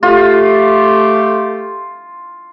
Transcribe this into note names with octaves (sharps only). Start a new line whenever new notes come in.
A3 F4 G4